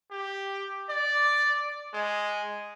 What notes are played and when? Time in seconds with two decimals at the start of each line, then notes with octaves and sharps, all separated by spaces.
0.11 G4
0.90 D5
1.94 G#3